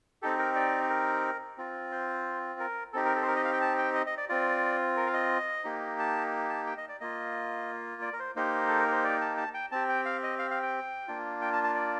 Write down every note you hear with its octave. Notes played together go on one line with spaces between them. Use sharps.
C4 D#4 G4 A4
A#4
D5
A#4
C4 F4
C5
A#4
C4 D#4 G4 A4
A#4
A4
C5
A#4
D#5
F5
G5
A5
G5
D#5
D#5
D5
C4 F4 D5
A#4
F5
D#5
A#3 D#4 G4
A5
A5
G5
D#5
D5
A#3 F4 D#5
D5
A#4
C5
A#3 D#4 G4 C5
A4
A#4
C5
D5
A5
A5
G5
C4 G4 A5
G5
F5
D#5
F5
F5
G5
A#3 D4 F4
G5
A5
A5
D5